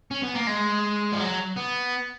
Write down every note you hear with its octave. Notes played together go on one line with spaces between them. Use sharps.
C#4
B3
A#3
G#3
F3
F#3
B3